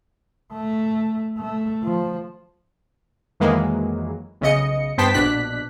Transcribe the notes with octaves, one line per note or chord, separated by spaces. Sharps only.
A3
A3
F3
F2 D#3 E3 F#3 G#3 A#3
B1 C#3 D#5 C#7
G2 B3 C5 G5 A5 B6
A#1 B2 D4 F#6 B6